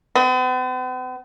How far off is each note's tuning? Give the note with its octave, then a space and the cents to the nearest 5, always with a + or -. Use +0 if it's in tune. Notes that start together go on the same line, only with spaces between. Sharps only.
B3 +45